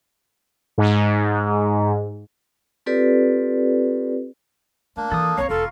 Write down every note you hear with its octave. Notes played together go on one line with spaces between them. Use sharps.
G#2
C4 F4 G4 A4 B4 D5
A3 A#3 D4
E3 A4 D#6
A#1 C4 C#5 F5 A#5 C#6
E1 F4 A4